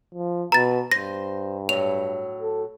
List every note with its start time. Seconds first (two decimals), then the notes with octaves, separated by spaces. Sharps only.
0.15 F3
0.52 B2 B4 A#5 A6
0.91 G2 C5 A#6
1.69 A2 F#3 F7
2.41 A4